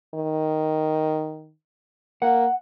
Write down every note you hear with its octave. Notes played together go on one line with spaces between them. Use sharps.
D#3
A#3 F#5